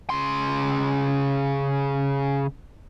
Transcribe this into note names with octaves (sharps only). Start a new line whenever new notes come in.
C#3 C6